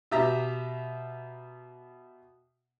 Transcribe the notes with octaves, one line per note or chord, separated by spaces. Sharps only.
B2 G4 E5 A#5